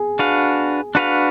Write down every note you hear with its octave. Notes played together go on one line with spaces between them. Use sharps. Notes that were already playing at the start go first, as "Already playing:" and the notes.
Already playing: G#4
D4 F#4 B4 F5
D4 F#4 B4 F5